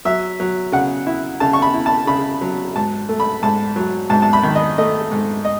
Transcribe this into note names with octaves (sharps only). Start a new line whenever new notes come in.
F#3 E5
F#3
C#3 F#5
E4
C#3 A5
C#6
B5
E4
A5
C#3 B5
F#3
G#2 A5
A3
B5
G#2 A5
F#3
G#2 A5
A5
B5
D#3
D#5
A3 D#5
G#2
D#5